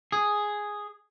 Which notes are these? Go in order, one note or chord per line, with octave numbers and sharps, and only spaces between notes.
G#4